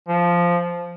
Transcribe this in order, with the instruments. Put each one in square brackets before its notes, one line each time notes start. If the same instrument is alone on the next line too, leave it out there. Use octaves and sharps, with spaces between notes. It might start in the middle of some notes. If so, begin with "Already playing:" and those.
[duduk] F3